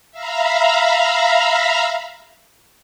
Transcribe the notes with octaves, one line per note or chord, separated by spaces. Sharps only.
E5 F5 A#5 B5